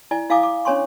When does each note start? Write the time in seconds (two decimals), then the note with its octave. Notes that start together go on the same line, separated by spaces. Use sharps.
0.11 E4 D5 G#5
0.30 E4 F5 G#5 D6 D#6
0.43 D6
0.65 C#4 D4 C#5 G#5 C6 C#6